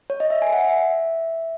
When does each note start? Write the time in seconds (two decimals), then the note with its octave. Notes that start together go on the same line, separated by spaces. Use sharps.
0.10 C#5
0.20 D#5
0.30 E5
0.42 G#5
0.53 F#5
0.65 E5